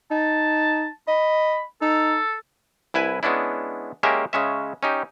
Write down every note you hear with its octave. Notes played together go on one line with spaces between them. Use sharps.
D#4 A5
D#5 B5
D#4 A4
C2 E4 B4 G#5
G#3 B3 C#4 D4 E4
G#3 A#3 C#4 G4 A#4 E5
C#3 G#3 C#4 E5
C#4 D#4 G4